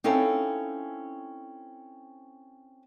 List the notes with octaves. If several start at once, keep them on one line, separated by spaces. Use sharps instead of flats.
C4 C#4 D#4 E4 A4 F5